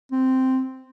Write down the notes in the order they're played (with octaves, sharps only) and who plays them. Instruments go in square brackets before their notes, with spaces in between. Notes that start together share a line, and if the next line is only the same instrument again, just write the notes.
[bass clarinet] C4